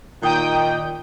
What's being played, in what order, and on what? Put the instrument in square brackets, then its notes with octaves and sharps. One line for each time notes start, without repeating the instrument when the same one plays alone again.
[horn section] A#2 D#3 [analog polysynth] G5 D#6 G6